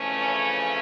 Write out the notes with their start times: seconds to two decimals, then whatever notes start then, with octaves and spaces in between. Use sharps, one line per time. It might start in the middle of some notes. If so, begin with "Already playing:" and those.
Already playing: F2 C#3 E3 A3 C#4
0.21 C#5